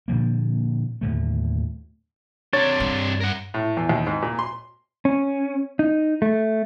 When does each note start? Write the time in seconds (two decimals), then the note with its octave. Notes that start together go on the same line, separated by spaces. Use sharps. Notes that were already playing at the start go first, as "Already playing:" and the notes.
0.08 A#2 D3 F3 A#3
1.01 D#2 A2 D3 A3
2.53 C3 D4 C#5 A6
2.80 G2
3.21 A#4 F#5
3.54 A2
3.77 E2
3.89 D#2
4.07 G#2
4.22 A#2
4.39 C6
5.05 C#4
5.79 D#4
6.22 A3